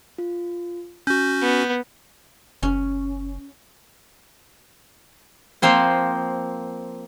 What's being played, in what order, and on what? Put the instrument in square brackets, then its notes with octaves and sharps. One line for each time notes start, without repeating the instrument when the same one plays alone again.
[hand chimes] F4
[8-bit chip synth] C#4 F#4 [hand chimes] G6
[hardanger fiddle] B3
[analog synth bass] F#1 [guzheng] C#4
[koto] F3 A#3 C4 C5